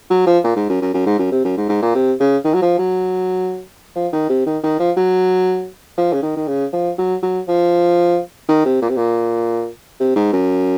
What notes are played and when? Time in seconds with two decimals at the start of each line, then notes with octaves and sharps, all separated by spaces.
0.10 F#3
0.27 F3
0.44 A#2
0.56 G#2
0.69 F#2
0.82 F#2
0.94 F#2
1.06 G#2
1.19 F#2
1.32 C3
1.45 F#2
1.57 G#2
1.69 G#2
1.82 A#2
1.95 C3
2.20 C#3
2.45 D#3
2.54 F#3
2.62 F3
2.79 F#3
3.96 F3
4.13 D#3
4.30 C3
4.46 D#3
4.63 D#3
4.80 F3
4.97 F#3
5.98 F3
6.13 C#3
6.22 D#3
6.37 D#3
6.48 C#3
6.73 F3
6.98 F#3
7.23 F#3
7.48 F3
8.49 D#3
8.65 C3
8.82 A#2
8.89 C3
8.97 A#2
10.00 C3
10.16 G#2
10.33 F#2